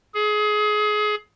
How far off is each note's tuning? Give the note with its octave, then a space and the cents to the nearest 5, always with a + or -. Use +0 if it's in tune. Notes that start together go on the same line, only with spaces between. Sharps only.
G#4 +25